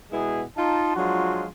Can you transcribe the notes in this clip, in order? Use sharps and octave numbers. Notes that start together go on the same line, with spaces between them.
B2 G#3 B3 E4 G#4
D#4 F4 A5
F3 F#3 G#3 D4 F4 F#4